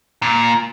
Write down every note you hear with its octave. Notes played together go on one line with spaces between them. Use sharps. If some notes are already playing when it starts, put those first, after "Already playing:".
A#2